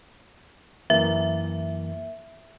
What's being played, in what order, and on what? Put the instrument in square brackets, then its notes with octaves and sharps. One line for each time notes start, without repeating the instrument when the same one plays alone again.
[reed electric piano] F#2 E3 A#3 [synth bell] E5